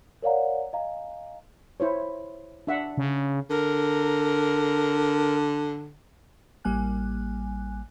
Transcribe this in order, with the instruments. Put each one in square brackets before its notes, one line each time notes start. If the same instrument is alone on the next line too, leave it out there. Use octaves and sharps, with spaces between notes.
[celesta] A#4 C#5 D5 F5 F#5 A#5
D#5 F5 G#5 A#5
[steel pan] E4 C5 C#5
D4 E5 F#5
[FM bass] C#3
[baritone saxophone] D3 [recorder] A#4
[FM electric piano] A1 G3 A#3 G#5 F#6